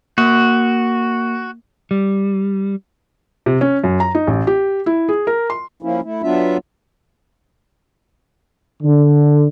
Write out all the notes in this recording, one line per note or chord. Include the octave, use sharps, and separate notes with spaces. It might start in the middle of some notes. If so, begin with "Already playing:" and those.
A#3 F#4
G3
C3
C#4
F#2
A#5
D#4
A1
G4
E4
G#4
A#4
C6
F3 A#3 C#4 E4
A3 E4
F#3 B3 D4 F4 E5
D3